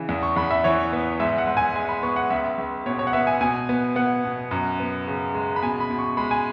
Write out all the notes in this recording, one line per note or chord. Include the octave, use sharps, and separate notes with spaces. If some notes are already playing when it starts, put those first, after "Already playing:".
Already playing: C#3 E3
E2
C#6
E2 B5
E5
E3 C#5
B3
G#2 E5
F#5
G#2
G#5
G#3 G#5
B5
B3 C#6
F#5
C#2 E5
C#2
B2 C#5
C#5
F#5
B3 E5
G#5
B2 G#5
B3
B3 F#5
B2
F#2
B3
C#3
G#3
B5
B2 G#5
B5
B2
C#6
G#3 B5
G#5